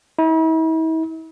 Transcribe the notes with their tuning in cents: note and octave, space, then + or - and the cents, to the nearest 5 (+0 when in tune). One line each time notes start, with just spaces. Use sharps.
E4 -45